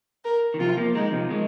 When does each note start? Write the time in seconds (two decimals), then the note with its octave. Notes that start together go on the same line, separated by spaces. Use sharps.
0.24 A#4
0.54 D#3
0.59 C3 F3 F4
0.77 F3 A#3
0.95 D#3 G#3 D#4
1.12 C3 F3
1.30 D#3 G#3